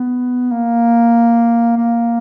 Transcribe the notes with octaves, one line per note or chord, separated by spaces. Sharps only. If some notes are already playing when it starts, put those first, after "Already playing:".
Already playing: B3
A#3
A#3